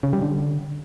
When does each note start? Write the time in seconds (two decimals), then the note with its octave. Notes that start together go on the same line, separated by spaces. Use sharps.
0.03 C#3
0.13 G3
0.22 D3